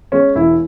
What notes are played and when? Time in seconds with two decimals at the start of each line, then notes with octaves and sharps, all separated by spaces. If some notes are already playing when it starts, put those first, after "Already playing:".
0.12 G#3 C#4
0.35 E1 E4